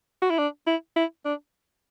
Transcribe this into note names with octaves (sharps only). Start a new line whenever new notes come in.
F#4
E4
D4
E4
E4
D4